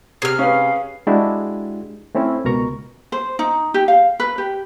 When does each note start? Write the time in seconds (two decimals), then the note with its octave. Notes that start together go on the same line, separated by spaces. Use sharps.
0.22 C3 G#4 F6
0.39 C#4 B4 F5
1.07 G#3 D4 E4 F#4 G4
2.15 A3 C4 C#4 E4
2.45 C#2 B2 A#4 A#5 C#6
3.12 C5
3.39 D#4
3.74 G4
3.88 F5
4.20 B4
4.38 G4